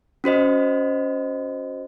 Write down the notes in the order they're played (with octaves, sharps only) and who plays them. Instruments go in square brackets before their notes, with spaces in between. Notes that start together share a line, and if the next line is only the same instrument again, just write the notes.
[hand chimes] C#4 F#4 C5 D#5